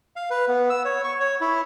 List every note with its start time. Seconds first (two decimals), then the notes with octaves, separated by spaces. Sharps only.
0.16 F5
0.30 B4
0.48 B3
0.70 E6
0.85 C#5
1.04 C#6
1.20 C#5
1.41 E4